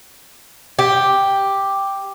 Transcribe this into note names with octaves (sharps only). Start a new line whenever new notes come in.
G4